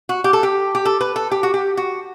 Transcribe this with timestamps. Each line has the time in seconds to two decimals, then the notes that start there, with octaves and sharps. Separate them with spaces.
0.09 F#4
0.24 G4
0.33 A4
0.43 G4
0.75 G4
0.85 A4
1.01 B4
1.16 A4
1.31 G4
1.43 F#4
1.54 G4
1.77 F#4